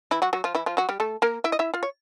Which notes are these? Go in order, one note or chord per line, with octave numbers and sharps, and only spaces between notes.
E3 E4
F#3 F#4
F#3 F#4
F3 F4
E3 E4
F3 F4
F#3 F#4
G3 G4
A3 A4
A#3 A#4
E4 E5
D#5
E4 E5
F4 F5
C#5